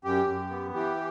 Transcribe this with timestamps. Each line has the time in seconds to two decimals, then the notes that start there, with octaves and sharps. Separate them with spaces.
0.04 F#2 G4
0.28 F#2
0.50 B3
0.74 E3 G4